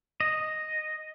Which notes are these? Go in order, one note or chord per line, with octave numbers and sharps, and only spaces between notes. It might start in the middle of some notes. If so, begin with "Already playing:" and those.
D#5